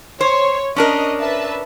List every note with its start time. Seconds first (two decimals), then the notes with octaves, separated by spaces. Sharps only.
0.21 C5 C#5
0.76 C#4 D4 A#4 D#5
1.18 B4 E5 A5